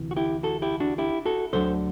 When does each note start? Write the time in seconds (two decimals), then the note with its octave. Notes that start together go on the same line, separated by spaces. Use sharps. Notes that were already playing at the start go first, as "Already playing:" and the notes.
Already playing: D2 C3 E3
0.11 F#4
0.16 E4 G4
0.43 F#4 A4
0.62 E4 G4
0.80 D4 F#4
0.98 E4 G4
1.26 F#4 A4
1.53 D2 D3 F#3 A4 C5